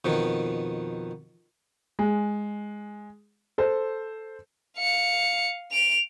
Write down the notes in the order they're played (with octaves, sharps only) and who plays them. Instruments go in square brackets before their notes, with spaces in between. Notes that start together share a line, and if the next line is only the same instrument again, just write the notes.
[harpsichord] F2 B2 D#3
[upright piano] G#3
A4 C5
[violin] F5 C#7
D7 F7